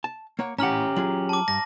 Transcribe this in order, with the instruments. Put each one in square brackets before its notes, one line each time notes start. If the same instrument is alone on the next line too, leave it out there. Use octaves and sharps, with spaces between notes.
[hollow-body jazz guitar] A5
A#3 C#5 F#5
[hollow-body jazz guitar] A2 F#5 [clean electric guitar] C#4 G4 [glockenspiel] A#5 F6 F#7
[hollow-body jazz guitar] F#3 F4 G#4 [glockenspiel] F#7
[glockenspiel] A5 D6
[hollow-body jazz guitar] G2 [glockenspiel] A#6